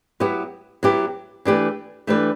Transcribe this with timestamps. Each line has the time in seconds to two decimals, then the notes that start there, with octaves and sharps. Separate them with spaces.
0.20 F#3 B3 E4 G4
0.83 F#3 B3 E4 G4
1.45 E3 A3 D4 G4 B4
2.07 E3 A3 D4 G4 B4